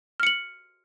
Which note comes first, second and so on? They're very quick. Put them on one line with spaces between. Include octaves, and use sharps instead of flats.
F6 C#7 F#7